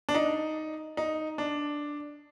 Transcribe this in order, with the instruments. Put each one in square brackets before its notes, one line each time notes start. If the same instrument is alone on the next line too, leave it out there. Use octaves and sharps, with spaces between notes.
[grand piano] D4
D#4
D#4
D4